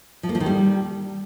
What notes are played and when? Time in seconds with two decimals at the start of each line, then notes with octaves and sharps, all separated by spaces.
0.23 F3
0.29 A#3
0.35 F3
0.40 D#3
0.46 G3